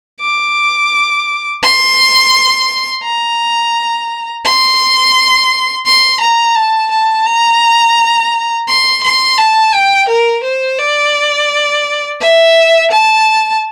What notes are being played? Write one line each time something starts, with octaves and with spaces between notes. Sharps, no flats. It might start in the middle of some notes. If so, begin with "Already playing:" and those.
D6
C6
A#5
C6
C6
A#5
A5
A5
A#5
C6
C6
A5
G5
A#4
C5
D5
E5
A5